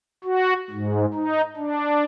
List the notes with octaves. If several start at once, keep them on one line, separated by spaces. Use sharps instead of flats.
F#4
G#2
D#4
D4